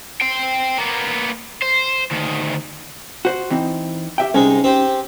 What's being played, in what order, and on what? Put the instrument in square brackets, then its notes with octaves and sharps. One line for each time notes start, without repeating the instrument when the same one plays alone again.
[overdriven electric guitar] C5 G5
A#3 B3
C5
D2 D#3
[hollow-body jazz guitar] F#4 C5
E3 C4 D#4
G4 E5 G5
[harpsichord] C2 G#2 G#3 [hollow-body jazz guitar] C#4 D#4
[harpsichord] C4 G4 C5